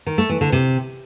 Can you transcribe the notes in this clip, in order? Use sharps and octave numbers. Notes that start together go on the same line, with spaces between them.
D#3
A3
E3
D3
C3